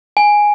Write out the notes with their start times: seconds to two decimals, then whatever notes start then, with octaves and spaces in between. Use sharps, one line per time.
0.17 G#5